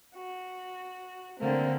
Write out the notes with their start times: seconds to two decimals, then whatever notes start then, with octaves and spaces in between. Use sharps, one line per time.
0.14 F#4
1.39 D3 A3 A#3 C4